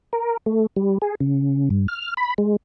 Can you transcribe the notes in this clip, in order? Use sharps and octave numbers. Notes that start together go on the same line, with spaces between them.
A#4
A3
G3
G#4
C#3
G2
F6
B5
G#3